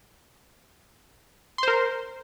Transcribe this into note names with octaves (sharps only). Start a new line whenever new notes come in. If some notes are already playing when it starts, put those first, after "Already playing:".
A#4 C5 C6